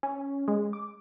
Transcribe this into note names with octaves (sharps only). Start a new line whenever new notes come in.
C#4
G#3
D6